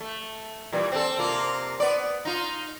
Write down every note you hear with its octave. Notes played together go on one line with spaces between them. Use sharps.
A3
A#2 E3 G3
C4 A4
C3 A#3 F4
B3 D5
D#4 F4